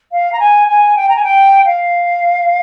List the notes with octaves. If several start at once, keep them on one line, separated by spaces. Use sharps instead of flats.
F5
A#5
G#5
G#5
G5
A#5
G#5
G5
F5